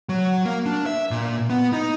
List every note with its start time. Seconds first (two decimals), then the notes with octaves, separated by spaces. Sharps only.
0.09 F#3
0.45 A#3
0.66 D4
0.86 E5
1.11 A#2
1.50 B3
1.73 D#4